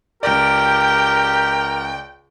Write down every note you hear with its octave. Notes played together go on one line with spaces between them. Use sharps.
C#2 G4 A#4 D5 G5